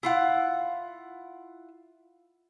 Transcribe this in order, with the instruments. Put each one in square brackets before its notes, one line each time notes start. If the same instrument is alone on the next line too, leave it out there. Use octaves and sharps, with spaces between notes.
[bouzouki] E4 F4 F#5